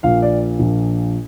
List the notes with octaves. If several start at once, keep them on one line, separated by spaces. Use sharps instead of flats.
A#1 A#2 F5
D5
A#1 A#2